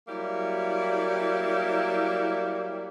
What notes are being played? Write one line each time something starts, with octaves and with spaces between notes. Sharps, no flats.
F#3 G3 A#3 E4